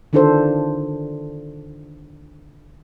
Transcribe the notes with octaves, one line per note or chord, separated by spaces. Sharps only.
D3 D#3 D4 F4 A4 C5